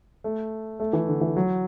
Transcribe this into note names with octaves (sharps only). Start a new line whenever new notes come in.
A3
A3
E3
D3
E3
F#3